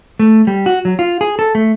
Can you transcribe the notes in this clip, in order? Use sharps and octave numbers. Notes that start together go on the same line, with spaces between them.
A3
G3
F#4
F#3
F4
G#4
A4
A3